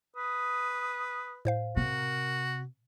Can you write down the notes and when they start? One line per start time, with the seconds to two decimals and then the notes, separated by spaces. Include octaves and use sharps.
0.16 B4 D#6
1.45 A2 C5 F5
1.76 C3 F#4 A#4